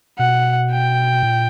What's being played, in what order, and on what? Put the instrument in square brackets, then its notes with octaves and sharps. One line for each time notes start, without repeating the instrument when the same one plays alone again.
[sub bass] B2 [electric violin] F#5
[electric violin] G5
[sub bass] A#2